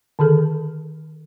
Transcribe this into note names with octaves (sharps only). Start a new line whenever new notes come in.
D3 D#3 G#4 A4